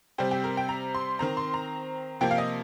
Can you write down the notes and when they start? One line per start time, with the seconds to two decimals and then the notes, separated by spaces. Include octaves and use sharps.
0.18 C3 G3 C4 G4
0.31 G4
0.44 A#4
0.57 G5
0.69 A#5
0.95 C6
1.19 D#3 C4 A#5
1.37 C6
1.54 A#5
2.21 C3 F3 A#3 G5
2.31 F5
2.38 D#5